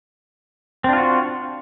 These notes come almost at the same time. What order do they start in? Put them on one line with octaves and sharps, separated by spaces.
C4 D4 F4 F#4